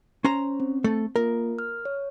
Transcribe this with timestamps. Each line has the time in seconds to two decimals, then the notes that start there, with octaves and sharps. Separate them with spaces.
0.24 C#4 C5 A#5
0.60 C4
0.84 A3 A4
1.16 A#3 F4 A#4
1.59 F6
1.85 C#5